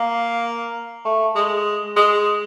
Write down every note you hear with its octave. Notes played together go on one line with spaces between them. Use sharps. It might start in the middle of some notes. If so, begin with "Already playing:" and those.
Already playing: A#3
A3
G#3
G#3